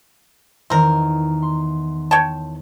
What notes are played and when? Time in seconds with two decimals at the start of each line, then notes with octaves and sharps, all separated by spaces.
0.70 E2 D#3 C4 A#4
1.42 C6
2.11 C#5 G5 A5